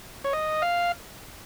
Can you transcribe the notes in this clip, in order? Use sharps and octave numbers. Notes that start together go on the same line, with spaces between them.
C#5
D#5
F5